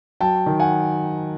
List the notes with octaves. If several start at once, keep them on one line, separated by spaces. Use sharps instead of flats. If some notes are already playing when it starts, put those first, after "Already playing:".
F#3 G5 A5
D#3
F#5 G#5